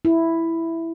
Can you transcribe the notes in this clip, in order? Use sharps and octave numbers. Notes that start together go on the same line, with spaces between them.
E4